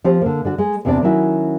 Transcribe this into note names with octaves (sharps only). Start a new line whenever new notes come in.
F3 C4 G4 C5
D3 A#3
D3 D4 F#4
G#3
E2 C3 B3 C4 D4 D5
D#3 F#3 C#4 E4 F#4